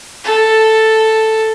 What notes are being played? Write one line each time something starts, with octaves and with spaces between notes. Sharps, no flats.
A4